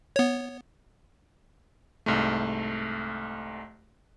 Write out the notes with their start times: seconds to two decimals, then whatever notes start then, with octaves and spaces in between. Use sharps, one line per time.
0.16 B3 C#5
2.06 C2 G#2 A3